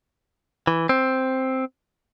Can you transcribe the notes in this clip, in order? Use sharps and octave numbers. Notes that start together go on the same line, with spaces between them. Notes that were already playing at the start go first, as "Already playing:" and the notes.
E3
C4